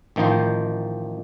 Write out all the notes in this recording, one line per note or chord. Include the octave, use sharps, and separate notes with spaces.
A1 D#3 F3 D#4 C5